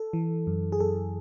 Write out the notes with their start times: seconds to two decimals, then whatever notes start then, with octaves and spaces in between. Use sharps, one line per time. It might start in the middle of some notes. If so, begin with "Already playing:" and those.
Already playing: A4
0.13 E3
0.47 F#2
0.72 G#4
0.80 F#2 A4